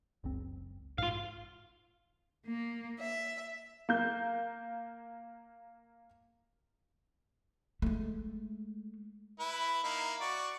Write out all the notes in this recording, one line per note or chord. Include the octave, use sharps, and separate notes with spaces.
F#1 C#2 C4
A1 G#2 F4 F5
A#3
E5
A#3 G6
G#3 A3
E4 B4
A#3 D#4 E4
F#4 D5 C#6